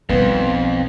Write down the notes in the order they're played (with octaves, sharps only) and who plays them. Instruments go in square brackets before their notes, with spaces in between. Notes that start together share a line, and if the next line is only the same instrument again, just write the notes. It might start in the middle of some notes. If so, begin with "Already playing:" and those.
[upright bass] B1 G3 [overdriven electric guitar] F2 [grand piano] B3